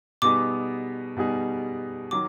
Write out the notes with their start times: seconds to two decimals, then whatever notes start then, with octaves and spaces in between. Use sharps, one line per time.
0.22 B2 G3 B3 D#4 G#4 D6
1.17 B2 G3 B3 D#4 G#4
2.11 D#3 F#3 D6